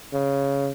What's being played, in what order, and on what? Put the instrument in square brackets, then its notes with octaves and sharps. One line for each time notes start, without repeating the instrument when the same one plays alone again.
[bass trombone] C#3